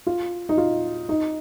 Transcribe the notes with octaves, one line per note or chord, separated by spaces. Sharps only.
F4
D#4
F4
D#4